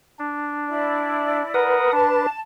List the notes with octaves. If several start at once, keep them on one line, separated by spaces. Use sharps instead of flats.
D4
E4 D5
A#4 B4 F#5 D#6
D4 A5